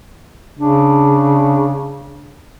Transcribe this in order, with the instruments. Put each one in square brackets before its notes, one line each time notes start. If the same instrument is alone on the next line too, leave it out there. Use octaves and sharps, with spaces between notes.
[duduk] C#3 [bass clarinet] D4